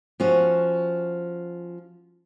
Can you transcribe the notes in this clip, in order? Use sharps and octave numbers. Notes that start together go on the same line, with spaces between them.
F3 C#4 F#4